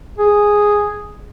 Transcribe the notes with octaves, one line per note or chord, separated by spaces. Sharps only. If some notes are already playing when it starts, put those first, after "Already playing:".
G#4